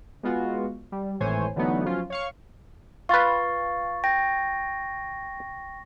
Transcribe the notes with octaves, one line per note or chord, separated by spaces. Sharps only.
G#3 B3 F4 F#4
G3
G#1 A2 E3 C5 C#5 G#5
D3 E3 F#3 A3 B3 D#4
F3 F#3 C#4 F4
C#5 F5 C#6
F4 B4 F5 C#6 A6
G5 A#6